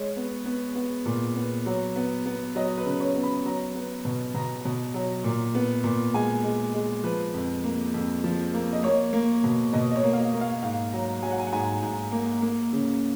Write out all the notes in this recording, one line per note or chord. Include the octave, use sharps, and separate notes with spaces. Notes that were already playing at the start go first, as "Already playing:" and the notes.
Already playing: G#3 C#5
B3
B3
B3
A#2
B3
F#3
B3
B3
F#3 D#5
B4
C#3
B4
C#5
B3
B5
F#3 A#5
B3
B2
B2 A#5
B2
F#3
A#2
B3
A#2
G#3 G#5
G#3
G#3
F3 B4
F2
A#3
F2
F3
A#3
D#5
A#3 C#5
A#3
B2
B2 D#5
D#5
C#5
A#3
F5
D#5
A#3
F5
G#2 F5
F#3 A#5
F#3 G#5
F#5
G#5
F#5
G#2 G#5
G#2
A#3
A#3
C#3